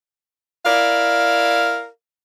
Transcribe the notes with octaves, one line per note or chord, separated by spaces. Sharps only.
E4 A#4 D5 F5